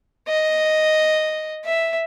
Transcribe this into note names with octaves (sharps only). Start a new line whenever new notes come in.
D#5
E5